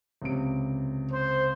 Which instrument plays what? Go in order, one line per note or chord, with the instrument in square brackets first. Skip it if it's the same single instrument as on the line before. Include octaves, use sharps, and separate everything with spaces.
[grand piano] C#2 C3 D7
[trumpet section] C5